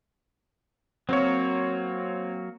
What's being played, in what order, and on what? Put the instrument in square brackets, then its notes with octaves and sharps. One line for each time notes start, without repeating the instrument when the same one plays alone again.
[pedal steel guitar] F#3 A#3 F#4 [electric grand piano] C4 C#5